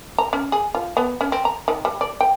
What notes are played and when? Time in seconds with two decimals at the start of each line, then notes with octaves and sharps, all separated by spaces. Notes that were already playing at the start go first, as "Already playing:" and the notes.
0.18 A#5
0.33 C#4
0.52 G#4
0.75 F4
0.97 B3
1.21 C#4
1.32 C4
1.45 A#5
1.68 D#3
1.85 G3
2.01 D5
2.20 G5